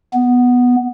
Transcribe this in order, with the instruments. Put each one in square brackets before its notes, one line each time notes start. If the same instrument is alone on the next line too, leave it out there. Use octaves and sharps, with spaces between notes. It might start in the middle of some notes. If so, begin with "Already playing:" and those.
[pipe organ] B3